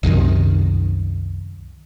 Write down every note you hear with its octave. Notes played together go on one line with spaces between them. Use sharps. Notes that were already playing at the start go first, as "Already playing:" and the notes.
C2 F#2 C3 D#3